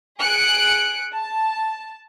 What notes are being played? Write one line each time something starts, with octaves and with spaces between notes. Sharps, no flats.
G#4 F#6 C#7 D7
A5